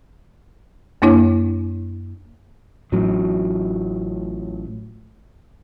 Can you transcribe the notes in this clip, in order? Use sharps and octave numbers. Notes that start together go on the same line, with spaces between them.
F#2 A#3 D4 E4 C#5
A1 A2 F#3